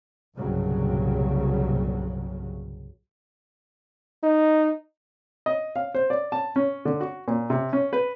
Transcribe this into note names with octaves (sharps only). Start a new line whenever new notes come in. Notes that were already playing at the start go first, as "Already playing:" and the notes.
C2 G2 A#2 C#3 F#3
D#4
D#5
F5
C5
D5
A5
C#4
D3
F#4
A#2
C3
C#4
B4